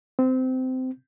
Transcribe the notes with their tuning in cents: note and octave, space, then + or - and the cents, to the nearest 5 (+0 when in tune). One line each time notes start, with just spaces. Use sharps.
C4 -20